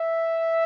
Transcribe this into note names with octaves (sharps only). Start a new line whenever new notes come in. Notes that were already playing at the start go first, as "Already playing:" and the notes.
Already playing: E5